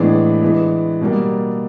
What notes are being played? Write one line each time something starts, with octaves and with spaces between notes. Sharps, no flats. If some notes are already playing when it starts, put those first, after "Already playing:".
Already playing: A2 E3 G#3 B3 D4
E3 G#3 B3
B2 G3 A#3